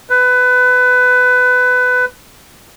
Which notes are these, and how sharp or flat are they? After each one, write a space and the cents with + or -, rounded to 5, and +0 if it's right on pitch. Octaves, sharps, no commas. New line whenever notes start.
B4 +20